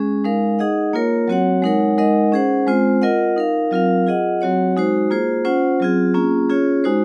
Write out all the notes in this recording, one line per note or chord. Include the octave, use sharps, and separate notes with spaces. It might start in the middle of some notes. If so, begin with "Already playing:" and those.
Already playing: G#3 C#4 G#4
G#3 D#4 A#4 F5
D#4 G#4 D#5 F#5
A#3 F4 A#4 C#5
F#3 C4 F#4 C#5 F#5
G#3 D#4 A#4 C#5 F#5
G#3 D#4 A#4 D#5 F#5
C#4 G#4 C5 F#5
G#3 C4 F4 C5
F4 A#4 D#5 F#5
D#4 A#4 F5
F#3 C4 F4 A#4 F5
F4 G#4 D#5 F#5
F#3 C4 F#4 C#5 F#5
G#3 D#4 F#4 C5
A#3 F4 G#4 C5
C#4 F4 C5 F#5
F#3 C4 F4 G#4
A#3 C#4 F4 G#4
C#4 F4 G#4 C#5
G#3 D#4 F#4 C5